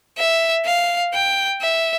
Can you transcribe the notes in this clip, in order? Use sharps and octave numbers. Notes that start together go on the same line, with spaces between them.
E5
F5
G5
E5